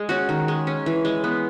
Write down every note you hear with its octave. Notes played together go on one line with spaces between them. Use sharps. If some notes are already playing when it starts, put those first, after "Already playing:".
Already playing: G#3
C#4 F#4
D#3
G#3
C#4
E3
G#3
B3